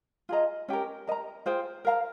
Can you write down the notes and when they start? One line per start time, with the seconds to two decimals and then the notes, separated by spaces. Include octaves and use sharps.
0.29 F4 G#4 D#5 A#5
0.69 C#4 G4 A#4
1.07 A#4 D#5
1.12 A#5
1.46 F4 G#4 C5 G5
1.85 A#4 F5 A#5